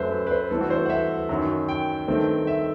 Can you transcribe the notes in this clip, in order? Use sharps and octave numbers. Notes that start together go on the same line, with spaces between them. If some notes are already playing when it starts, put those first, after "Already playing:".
Already playing: F#2 F#3 A3 B4 C5 E5
B4
B4
C5
G2 E3 A3 C4 A4
F#4
C5
F#5
E5
F#2 D#3 F#3
G5
G2 D#3 A3 C4
E5